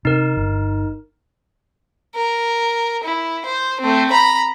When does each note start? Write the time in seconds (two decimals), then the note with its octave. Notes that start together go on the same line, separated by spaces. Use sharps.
0.05 C3 D#4 A#4
0.37 G1
2.15 A#4
3.04 E4
3.45 C5
3.80 A3 C4
4.10 A#5 B5